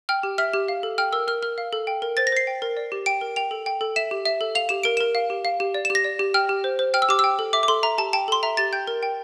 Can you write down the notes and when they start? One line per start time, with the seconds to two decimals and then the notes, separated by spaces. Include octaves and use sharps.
0.09 G5 F6
0.23 G4
0.38 E5 F6
0.53 G4
0.68 F5
0.83 A4
0.98 G5 F6
1.13 A#4 E6
1.28 A#4 F6
1.43 A#4 F6
1.58 F5
1.73 A4
1.87 G5
2.02 A#4
2.17 C5 A6
2.27 A#6
2.32 C5 C7
2.47 G5
2.62 A#4
2.77 D5
2.92 G4
3.06 G5 D7
3.21 A#4
3.36 G5 F7
3.51 A4
3.66 G5
3.81 A4
3.96 E5 E7
4.11 G4
4.26 E5
4.41 A4
4.55 F5 F7
4.69 G4 E7
4.83 A#4 D7
4.97 A#4 E7
5.15 F5
5.30 G4
5.45 F5
5.60 G4
5.74 D5
5.85 E7
5.90 G4
5.95 A#6
6.04 D5
6.19 G4
6.34 G5 F6
6.49 G4
6.64 C5
6.79 C5
6.94 G5 F6
7.02 E6
7.09 G4 D6
7.19 E6
7.24 G5
7.39 A4
7.53 E5 D6
7.63 D6
7.68 A4 C6
7.83 E5 A#5
7.98 G4 A5
8.13 G5 A5
8.28 A4 C6
8.43 E5 A#5
8.57 G4 A6
8.73 G5 G6
8.87 A#4
9.03 G5